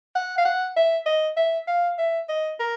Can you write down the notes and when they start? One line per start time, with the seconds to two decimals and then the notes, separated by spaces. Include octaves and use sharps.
0.15 F#5
0.38 F5
0.45 F#5
0.77 E5
1.06 D#5
1.37 E5
1.68 F5
1.98 E5
2.29 D#5
2.60 A#4